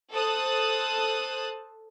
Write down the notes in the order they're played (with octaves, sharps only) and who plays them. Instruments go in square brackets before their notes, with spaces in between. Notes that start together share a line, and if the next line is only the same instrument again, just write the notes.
[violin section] A4 C5 A5 D#6 F#6